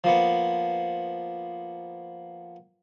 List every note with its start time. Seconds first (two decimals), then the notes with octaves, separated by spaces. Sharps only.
0.04 F3 A#3 B3